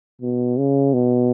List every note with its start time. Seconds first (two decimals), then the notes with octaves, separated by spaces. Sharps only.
0.22 B2
0.58 C#3
0.94 B2